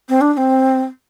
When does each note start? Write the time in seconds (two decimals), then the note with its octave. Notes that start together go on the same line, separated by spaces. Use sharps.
0.09 C4
0.21 D4
0.33 D4
0.37 C4